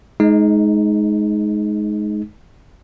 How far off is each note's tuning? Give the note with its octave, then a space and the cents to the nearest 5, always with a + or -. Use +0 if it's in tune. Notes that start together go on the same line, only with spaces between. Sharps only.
G#3 +30 D#4 +0